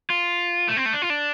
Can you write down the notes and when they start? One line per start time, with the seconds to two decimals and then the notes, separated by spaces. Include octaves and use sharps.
0.10 F4
0.68 A3
0.77 C4
0.86 A3
0.93 D4
1.02 F4
1.10 D4